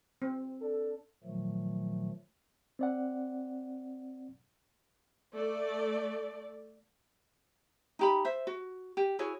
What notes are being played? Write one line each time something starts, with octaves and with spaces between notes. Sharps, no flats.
C4
D4 A4
A#2 D#3 F3 F#3 A3
C4 D5 F#5
A3 D5
D#4 G4 B5
C5 E5
F#4
G4
E4 F#4 G#4 C#5